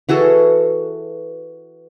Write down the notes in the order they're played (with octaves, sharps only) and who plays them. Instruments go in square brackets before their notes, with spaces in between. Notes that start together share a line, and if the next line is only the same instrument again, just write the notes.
[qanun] E3 F#4 G#4 A4